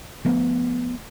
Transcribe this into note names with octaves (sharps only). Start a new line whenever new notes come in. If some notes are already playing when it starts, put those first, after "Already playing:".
F3 A3 B3